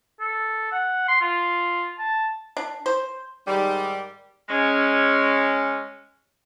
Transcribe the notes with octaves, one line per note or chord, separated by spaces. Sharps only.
A4
F#5
C6
F4
A5
D4
C5
G#2 D#3 G3
G#3 C#4